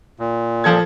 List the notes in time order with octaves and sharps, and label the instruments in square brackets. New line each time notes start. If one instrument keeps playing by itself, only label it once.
[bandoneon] A#2
[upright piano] F3 A4 G#6